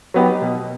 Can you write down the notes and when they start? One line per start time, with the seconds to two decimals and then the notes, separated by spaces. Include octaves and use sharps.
0.14 F#3 B3 D#4 G4
0.42 B2